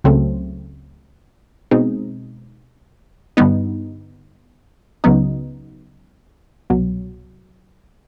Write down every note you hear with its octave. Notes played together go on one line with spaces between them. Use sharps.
C#2 C#3 F#3 A3 C4
B2 G#3 C4 D#4
G2 D3 G3 B3 D#4
C#2 C#3 F#3 B3 D#4
C2 B2 F#3